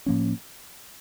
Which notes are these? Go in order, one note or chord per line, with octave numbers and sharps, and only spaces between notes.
A2 F3 A#3 C#4